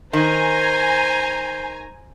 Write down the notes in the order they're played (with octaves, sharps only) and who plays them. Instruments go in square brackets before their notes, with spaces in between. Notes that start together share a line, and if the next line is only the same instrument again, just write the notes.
[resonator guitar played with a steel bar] D#3 [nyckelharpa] C5 [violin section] G#5 A#5